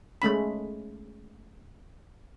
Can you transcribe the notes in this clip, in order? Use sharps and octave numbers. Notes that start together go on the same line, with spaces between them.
G#3 A3 C#4 B5